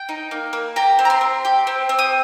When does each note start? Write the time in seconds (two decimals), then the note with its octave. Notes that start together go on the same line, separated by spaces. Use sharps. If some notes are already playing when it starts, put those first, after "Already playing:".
Already playing: G5
0.09 D#4
0.31 A#3
0.53 A#3
0.76 G4 A#5
0.99 C4
1.05 A#5
1.10 C6
1.21 C4
1.45 G4
1.67 C4
1.89 C4
1.99 D#6